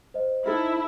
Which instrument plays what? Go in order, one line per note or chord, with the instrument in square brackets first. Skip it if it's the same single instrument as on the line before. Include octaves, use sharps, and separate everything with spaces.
[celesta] C5 D#5
[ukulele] D#4 A4 A#4 [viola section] E4